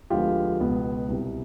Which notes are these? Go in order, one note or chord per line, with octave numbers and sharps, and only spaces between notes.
D2 D3 F3 G#3 B3 F4 G4
C#2 B2 G#3 B3
C2 B2 G3